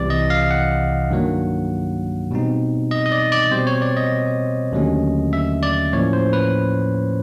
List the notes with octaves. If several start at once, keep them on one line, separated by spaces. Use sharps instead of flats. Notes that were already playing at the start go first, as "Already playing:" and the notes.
Already playing: C2 C3 E3 D5
D#5
F5
F#5
G2 D#3 F#3 A#3
B2 G3 C4 D#4
D#5
D#5
D5
D5
B2 G3 C4 C5
C#5
D5
D#5
D#2 D3 F#3 A3 C#4
E5
D5
A2 F3 A#3 C#4 C#5
C5
B4